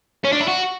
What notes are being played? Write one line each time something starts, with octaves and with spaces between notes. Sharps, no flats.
C#4
D4
E4
F#4